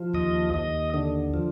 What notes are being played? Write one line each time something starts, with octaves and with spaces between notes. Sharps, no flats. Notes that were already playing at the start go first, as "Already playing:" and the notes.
Already playing: F3
D#2 D#5
D#2 D#5
D3
F3